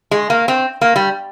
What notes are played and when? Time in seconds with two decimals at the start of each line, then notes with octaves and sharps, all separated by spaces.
0.11 G#3
0.30 A#3
0.48 C4
0.81 A#3
0.96 G3